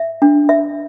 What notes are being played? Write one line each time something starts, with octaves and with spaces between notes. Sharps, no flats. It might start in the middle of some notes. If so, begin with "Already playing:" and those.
Already playing: E5
D4
E5